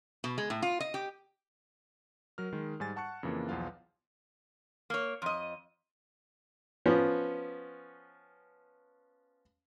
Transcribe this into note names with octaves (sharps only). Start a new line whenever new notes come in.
B2
G#3
A2
F4
D#5
G4
F#3 A#4 F6
D#3 G#3
G#2 G3 G#5 A6
F#5 A5 C#6 F#6 C#7
F2 C#3 E3 A#3
B1 E2 F3 F4 F5 F#5
A#3 C#5
F2 D#5
F3 B3 C#4